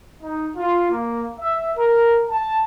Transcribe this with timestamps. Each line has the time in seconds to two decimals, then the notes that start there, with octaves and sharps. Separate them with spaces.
0.22 D#4
0.57 F4
0.90 A#3
1.39 E5
1.76 A#4
2.30 A5